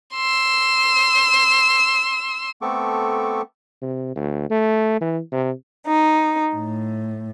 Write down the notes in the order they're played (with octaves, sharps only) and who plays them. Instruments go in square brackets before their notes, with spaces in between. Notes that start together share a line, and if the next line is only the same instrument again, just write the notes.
[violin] C6 E6
[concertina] A3 B3 C4 A4 C#6 D6
[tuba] C3
D2
A3
E3
C3
[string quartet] D#4
A2